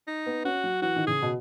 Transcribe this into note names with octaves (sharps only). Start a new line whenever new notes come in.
D#4
B3
C#4 F#4
F#3
E3 F#4
D#3
C#3 G#4
B2